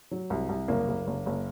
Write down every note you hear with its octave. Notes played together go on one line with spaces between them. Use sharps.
F#3
C2
C2
F#1 A#3
F#1
F#1
F#1